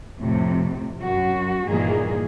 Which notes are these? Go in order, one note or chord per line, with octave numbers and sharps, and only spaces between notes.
F2 A2 C3
F#2 F#4
G2 A#2 D#3 E3 A#3 G#4